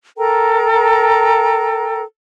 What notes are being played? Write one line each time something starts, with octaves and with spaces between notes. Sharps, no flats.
A4 A#4 G5 A#5